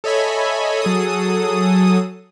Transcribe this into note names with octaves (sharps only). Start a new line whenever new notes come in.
A4 C#5 D#5 E5 G#5 B5
F#3 G#4 A4 D#6